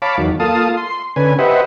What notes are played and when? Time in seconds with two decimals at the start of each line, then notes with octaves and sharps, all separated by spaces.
0.02 C#5 F5 A5 B5 D6
0.18 E2 D#3 F#3
0.40 A#3 F4 A4 F5 A5 D#6
0.77 C6
1.16 D3 C#4 B4 G#5
1.39 G4 B4 C5 D#5 E5 F#5